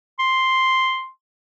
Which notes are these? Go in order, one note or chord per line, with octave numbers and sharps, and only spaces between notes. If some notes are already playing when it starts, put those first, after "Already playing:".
C6